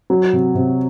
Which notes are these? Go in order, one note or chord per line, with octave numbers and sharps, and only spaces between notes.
F#3
C3
C3